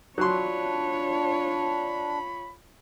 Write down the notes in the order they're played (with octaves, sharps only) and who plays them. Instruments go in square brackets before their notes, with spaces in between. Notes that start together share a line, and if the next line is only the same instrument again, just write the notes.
[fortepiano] F#3 C6 [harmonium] D4 [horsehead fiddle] F4 C#5 [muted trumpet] B5